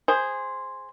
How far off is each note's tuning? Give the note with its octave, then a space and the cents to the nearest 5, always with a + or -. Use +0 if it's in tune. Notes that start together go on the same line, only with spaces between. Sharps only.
G#4 -10 C5 +0